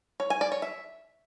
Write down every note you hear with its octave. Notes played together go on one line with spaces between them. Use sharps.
C#5
G#5
D5
C#5
E5